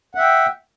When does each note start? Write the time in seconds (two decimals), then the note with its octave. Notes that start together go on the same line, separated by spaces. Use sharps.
0.15 F#5
0.18 E5
0.21 G5